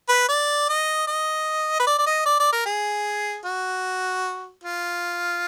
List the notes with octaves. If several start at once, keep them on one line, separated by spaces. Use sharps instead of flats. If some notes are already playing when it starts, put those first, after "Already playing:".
B4
D5
D#5
D#5
B4
D5
D5
D#5
D5
D5
A#4
G#4
F#4
F4